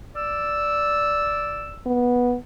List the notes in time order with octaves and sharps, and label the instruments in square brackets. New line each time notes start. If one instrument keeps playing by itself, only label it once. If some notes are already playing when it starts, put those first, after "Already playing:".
[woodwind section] D5 E6
[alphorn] B3